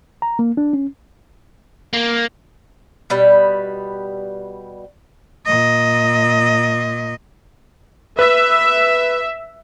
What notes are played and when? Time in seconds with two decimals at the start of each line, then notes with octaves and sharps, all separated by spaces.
0.22 A#5
0.39 A#3
0.57 D4
0.73 C#4
1.93 A#3
3.10 B2 G3 B4
5.46 A#2 D#5
8.19 B4 E5